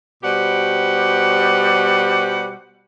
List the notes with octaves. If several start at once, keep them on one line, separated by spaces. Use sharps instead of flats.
B2 G3 G4 C5 F#5